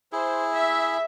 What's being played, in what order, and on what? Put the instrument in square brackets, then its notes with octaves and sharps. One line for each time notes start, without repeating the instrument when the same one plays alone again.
[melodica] E4 G#4 [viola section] C5
[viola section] E5